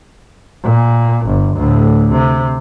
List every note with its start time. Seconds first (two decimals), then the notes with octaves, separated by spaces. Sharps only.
0.64 A#2
1.26 G1
1.57 D2 A2
2.12 C3